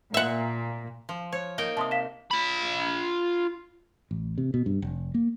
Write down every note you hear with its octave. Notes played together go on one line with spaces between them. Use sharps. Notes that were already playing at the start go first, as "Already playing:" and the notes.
A#2 E5 F#5
F3
C5 C#5
A#3 D#4 G5
C3 A5 C6 D#6
F5 B6 E7
F4 B5
A1
C3
B2
G2
F1
A#3